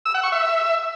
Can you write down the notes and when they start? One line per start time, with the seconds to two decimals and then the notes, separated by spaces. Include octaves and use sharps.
0.06 E6
0.14 F#5
0.23 C#6
0.32 E5